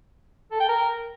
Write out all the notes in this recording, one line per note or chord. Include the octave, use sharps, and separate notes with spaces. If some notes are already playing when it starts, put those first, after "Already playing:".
A4
G5
A#4